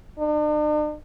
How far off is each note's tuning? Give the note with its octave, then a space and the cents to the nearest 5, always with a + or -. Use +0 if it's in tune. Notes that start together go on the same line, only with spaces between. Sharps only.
D4 +45